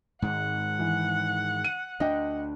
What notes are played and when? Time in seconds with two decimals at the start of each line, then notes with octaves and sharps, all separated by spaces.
0.22 G#2 D#3 G#3 F#5
0.79 E3
1.64 D#7
2.00 D2 D4 D#5 G5